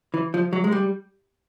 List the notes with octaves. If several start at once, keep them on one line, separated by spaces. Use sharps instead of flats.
E3
F3
F#3
G#3
G3